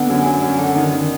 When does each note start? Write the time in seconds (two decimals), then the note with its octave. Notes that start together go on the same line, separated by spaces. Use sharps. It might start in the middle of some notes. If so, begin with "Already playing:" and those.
Already playing: D3 B3 D4
0.10 F#2
0.25 F#2
0.42 F#2
0.58 D3
0.75 D#3 D#4
0.92 D#3